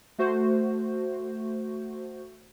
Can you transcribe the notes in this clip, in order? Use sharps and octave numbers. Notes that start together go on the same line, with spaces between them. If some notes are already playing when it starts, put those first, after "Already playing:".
A3 F#4 C5